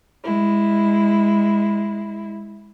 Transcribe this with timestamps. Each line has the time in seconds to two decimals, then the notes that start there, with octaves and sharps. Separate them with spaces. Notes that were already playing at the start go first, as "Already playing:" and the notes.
0.23 G#3 E4